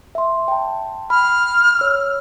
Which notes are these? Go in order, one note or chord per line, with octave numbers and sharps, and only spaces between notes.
E5 C6
G5 A5
B5 F6
C#5 E6